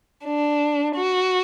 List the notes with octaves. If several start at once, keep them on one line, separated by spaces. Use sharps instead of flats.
D4
F#4